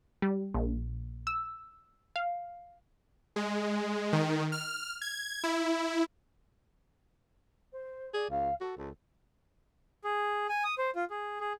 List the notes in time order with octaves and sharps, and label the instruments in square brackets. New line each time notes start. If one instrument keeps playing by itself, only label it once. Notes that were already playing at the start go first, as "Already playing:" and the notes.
[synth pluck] G3
A#1
E6
F5
[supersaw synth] G#3
D#3
F6
G#6
E4
[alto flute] C5
[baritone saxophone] G#4 [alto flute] D5
[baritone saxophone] C#2 [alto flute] F5
[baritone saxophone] F#4 [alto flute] A4
[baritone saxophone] C#2 [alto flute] A4
[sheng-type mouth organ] G#4
G#5
D#6
C5
F4
G#4
G#4